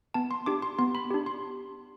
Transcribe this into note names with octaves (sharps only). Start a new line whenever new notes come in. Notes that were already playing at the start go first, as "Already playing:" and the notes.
B3 A5
C6
D4 G4 D6
C6
B3 C6
B5
D4 G4
C6